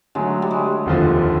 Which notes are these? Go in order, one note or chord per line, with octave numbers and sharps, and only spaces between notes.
D3 F#3 G#3 A3
G3
G#3
F1 D#2 D3 F3